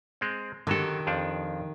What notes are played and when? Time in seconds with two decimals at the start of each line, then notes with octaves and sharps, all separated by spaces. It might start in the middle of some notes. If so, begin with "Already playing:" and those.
0.21 G#3 C4
0.67 D3 D#3 F#3 G4 A4
1.07 F2 F3 D4